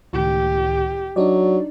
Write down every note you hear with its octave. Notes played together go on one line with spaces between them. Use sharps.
C#2 A2 D#3 G4
F#3 D4 D#4 D5